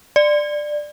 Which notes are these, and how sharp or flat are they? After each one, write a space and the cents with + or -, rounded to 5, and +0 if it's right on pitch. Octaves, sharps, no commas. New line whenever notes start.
D5 +15